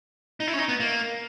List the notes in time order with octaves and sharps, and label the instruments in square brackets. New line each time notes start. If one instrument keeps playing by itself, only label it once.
[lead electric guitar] D#4
E4
C#4
D#4
B3
A#3